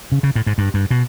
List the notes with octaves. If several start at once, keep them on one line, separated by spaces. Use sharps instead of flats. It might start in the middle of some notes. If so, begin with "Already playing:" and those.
C#3
C#3
A2
G#2
G2
G2
B2